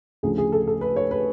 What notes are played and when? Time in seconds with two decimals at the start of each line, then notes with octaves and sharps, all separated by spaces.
0.23 D2 C#3 F3 A3 G#4
0.38 G#4
0.52 A4
0.67 A4
0.81 B4
0.96 C#5
1.11 B4